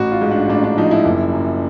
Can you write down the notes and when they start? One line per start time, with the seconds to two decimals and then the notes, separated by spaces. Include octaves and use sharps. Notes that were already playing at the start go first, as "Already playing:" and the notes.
Already playing: A1 F#4
0.12 F4
0.21 G#2
0.31 D4
0.49 A1 D4
0.64 D4
0.77 F3 D#4
0.91 E4
1.05 F#1
1.33 F#2